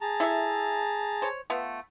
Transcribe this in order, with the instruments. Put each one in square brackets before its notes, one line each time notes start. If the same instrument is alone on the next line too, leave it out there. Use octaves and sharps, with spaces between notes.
[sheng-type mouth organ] G#4 A5 A#5
[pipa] E4 A4 E5
C5 C#5
A3 B3 F4